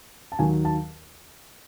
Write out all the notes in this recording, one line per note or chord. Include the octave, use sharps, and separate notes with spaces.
A5
D#2 D#3 F#3 G#5
A5